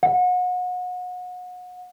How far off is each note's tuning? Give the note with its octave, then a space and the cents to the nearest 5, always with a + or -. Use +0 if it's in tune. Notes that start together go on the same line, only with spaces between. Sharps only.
F#5 -35